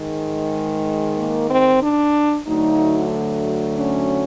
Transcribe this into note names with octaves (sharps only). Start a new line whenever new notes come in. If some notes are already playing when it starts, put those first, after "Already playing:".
Already playing: G#2 D#3 G#3
A#3
C4
D4
D2 D3 F#3 A3 D#4
C#4